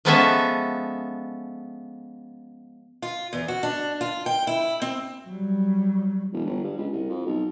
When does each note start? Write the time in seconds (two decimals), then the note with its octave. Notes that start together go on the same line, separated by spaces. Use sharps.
0.05 F3 G#3 B3 C#4 A4 E5
3.02 F4
3.33 E2
3.48 F#4
3.63 D4
4.01 F4
4.26 G5
4.47 E4
4.82 C4
5.27 F#3 G3
6.33 E1
6.45 G1
6.64 G2
6.78 C#2
6.93 C2
7.10 F2
7.26 B1